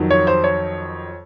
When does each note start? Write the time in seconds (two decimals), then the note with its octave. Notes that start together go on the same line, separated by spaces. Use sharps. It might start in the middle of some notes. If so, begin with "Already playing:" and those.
Already playing: F2 D#3 F#3
0.11 C#5
0.27 C5
0.44 C#5